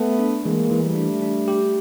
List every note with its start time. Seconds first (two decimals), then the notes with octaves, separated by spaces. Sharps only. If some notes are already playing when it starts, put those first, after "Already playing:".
Already playing: A3 B3
0.19 D4
0.45 E3 G#3 A#3
0.71 E3
0.83 G3 A3
0.96 D4
1.22 D4
1.48 G4